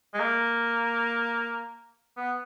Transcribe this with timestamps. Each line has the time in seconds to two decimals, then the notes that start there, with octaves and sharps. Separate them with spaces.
0.14 G#3
0.20 A#3
2.17 B3